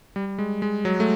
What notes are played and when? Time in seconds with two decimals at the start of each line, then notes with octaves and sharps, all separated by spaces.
0.16 G3
0.39 G#3
0.62 G#3
0.85 F#3
1.00 A3